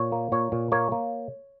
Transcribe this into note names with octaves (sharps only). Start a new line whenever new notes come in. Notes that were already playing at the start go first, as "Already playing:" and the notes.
Already playing: A#2 C#5
A#3
A#2 C#5
A#2
A#3 C#5
A#3